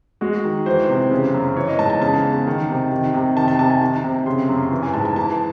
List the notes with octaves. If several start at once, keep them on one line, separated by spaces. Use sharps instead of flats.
G#3 F#4
D#3
E3 C5
C3
C#3
F#2
E3 C#5
D#5
G#2 A5
A5
C#3 A5
E2
D#3
C3
D#3
C3
D#3 A5
A5
C3 A5
G#5
D#3
C3
C#3 C6
F#2
E3
G#5
G#2 A5
A5
E3 A5